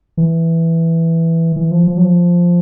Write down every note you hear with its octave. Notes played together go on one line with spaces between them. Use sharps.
E3
E3
F3
F3
F#3
F3